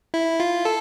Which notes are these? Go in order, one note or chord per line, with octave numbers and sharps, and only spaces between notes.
E4
F4
A4